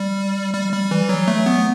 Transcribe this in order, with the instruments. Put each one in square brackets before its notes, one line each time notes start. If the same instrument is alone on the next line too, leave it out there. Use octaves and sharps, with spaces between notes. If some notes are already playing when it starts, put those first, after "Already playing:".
Already playing: [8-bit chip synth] G3
G3
G3
E3
F#3
A3
B3